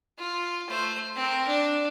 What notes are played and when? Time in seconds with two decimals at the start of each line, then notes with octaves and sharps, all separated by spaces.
0.18 F4
0.68 A3 C5
1.16 C4 A#4
1.47 D4